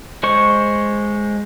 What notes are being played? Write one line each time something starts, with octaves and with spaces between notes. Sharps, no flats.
G#3 C5 C#6